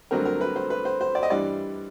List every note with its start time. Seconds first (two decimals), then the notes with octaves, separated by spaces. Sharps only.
0.11 G2 D3 F#3 A3 C4 A#4
0.25 A#4
0.41 B4
0.56 C5
0.70 B4
0.85 C5
1.01 C5
1.15 D5
1.23 D#5
1.30 G2 E3 G3 D5